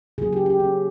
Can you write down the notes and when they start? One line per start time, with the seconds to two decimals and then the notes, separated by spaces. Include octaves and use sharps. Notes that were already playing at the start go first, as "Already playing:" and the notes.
0.18 C#3 F#3 A#3 G#4
0.33 G4
0.46 G4
0.60 C#4